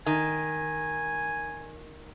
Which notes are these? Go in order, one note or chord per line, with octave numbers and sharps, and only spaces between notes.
D#3 G#5